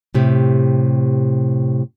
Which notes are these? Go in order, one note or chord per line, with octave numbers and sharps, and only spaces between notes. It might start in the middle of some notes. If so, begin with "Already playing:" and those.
A2 C3 G4